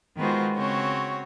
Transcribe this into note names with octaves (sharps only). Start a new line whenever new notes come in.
D#3 G#3 B3 F4 F#4 C5
C#3 C4 F#4 C#5